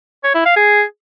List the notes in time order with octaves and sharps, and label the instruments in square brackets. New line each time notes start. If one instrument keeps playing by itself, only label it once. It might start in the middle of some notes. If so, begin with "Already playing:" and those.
[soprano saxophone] C#5
E4
F5
G#4